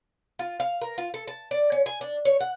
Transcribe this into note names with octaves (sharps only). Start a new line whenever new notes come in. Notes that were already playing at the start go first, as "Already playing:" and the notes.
F4
F5
A#4
F4
A4
A5
D5
C#4
G#5
D4
C#5
F#5